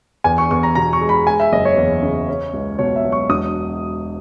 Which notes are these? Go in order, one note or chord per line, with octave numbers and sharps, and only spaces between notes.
E2 G#5
C#6
E2 C#6
A#5
B2 A#5
C#6
G#3
B5
G#3 G#5
E5
F#1 D#5
C#5
E2
C#3
C#4
C#2
B2 C#5
E5
F#3
C#6
E1 D#6